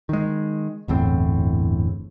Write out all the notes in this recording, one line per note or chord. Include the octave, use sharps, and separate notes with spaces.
D#3 G#3
G1 E2 A2 C4